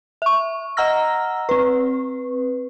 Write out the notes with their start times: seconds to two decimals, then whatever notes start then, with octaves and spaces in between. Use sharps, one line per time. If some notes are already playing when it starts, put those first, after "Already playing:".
0.22 E5 C#6
0.77 D#5 F#5 A#5 E6 F6 A#6
1.49 C4 B4